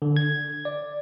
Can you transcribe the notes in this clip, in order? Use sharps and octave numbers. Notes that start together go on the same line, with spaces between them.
D3
G#6
D5